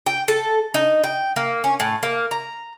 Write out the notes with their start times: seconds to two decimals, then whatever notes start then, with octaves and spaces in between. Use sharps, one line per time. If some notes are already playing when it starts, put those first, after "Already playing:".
0.06 G5
0.28 A4
0.74 D#4
1.04 G5
1.36 A#3
1.64 C#4
1.80 A2
2.03 A#3
2.31 A#5